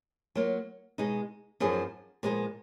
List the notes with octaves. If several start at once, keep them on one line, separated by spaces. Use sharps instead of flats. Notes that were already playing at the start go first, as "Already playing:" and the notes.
F#3 A#3 F4
B2 G#3 D#4
F#2 F3 B3 D#4 G#4
A#2 F3 G#3 B3 D#4